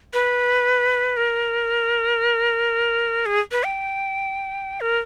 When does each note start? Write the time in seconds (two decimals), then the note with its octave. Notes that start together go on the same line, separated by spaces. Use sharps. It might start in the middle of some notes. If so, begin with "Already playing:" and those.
0.13 B4
1.17 A#4
3.26 G#4
3.52 B4
3.65 G5
4.81 A#4